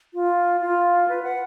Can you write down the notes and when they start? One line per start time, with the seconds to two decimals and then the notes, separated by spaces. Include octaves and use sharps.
0.14 F4
0.61 F4
1.08 B4
1.23 F#5